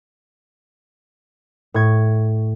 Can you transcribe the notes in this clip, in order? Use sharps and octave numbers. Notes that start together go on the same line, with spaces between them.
A2 C#6 G#6